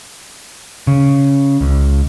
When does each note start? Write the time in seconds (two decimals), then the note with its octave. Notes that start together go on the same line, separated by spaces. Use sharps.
0.87 C#3
1.61 C#2